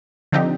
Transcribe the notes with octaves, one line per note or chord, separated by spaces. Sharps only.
D3 F3 C4 D#4 G4